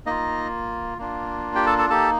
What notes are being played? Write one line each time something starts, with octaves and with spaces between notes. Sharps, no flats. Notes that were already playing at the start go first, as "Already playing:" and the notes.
A#3 D#4 F4 D#5
A#3 D4 F4
G4 G5
A4 A5
A4 A5
A#3 D#4 G4 A4 A5